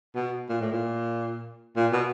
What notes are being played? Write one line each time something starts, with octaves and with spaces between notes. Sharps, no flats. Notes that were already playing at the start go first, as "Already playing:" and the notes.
B2
A#2
A2
A#2
A#2
B2